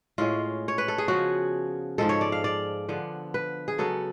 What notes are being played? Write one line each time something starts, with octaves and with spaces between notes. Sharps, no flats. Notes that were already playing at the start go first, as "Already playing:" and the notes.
A2 G#3 C#4 F4
C#5
B4
A4
G#4
C#3 F3 B3 F#4
G#2 F3 G#3 A4
C#5
D5
F5
D5
D3 F3 B3
B4
G#4
C#3 F#3 B3 A4